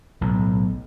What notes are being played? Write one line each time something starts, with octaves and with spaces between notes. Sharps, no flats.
B1 A2